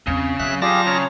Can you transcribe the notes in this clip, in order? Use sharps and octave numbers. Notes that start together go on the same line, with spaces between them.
E2 C#3 C4
B2 F#3 E5 F#6
F4 G4 G#4 D5 F5 G5 A5 A#6
C#3 C#5 A#5